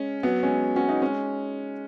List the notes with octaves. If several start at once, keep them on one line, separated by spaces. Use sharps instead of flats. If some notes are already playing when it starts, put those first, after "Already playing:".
Already playing: G#3 C#4
F#3 B3
G#3 C#4
C#4 F#4
B3 D#4
G#3 C#4